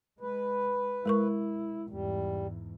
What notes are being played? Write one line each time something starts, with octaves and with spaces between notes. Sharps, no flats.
G#3 B4
G#3 E4 A#4 C#6
E2 G#2 G3